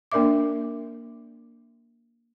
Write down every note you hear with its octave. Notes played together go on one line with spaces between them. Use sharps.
A#3 D4 A#4 D5 E5 D6